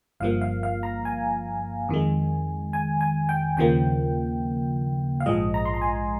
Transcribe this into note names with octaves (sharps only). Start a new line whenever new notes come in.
G1 G2 F3 A#3 F5
F5
F5
A#5
G#5
F2 D#3 G#3
G#5
G#5
G5
D#2 C#3 F3 A#3 G5
F5
A#1 G#2 F3 G#3 D#5
A#5
C6
A#5
G#5